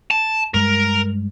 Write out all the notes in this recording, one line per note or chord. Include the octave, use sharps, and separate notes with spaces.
A5
G2 G#3 A#4